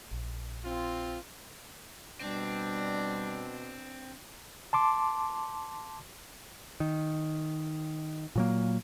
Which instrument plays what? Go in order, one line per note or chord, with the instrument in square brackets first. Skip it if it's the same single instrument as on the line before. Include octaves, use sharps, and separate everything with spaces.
[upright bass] A#1
[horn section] C4 F4
[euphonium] B2 [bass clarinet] G3 [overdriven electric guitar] C4 [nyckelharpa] D4
[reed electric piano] A5 C6 D6
[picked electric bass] D#3
A#2 F#3 A#3